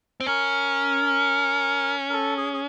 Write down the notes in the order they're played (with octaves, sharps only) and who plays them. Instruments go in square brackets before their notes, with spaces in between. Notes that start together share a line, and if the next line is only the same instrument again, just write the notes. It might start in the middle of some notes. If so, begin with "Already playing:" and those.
[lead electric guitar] C4
[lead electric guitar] C#4 [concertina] A#4
[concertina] A#4
A4
G#4
G#4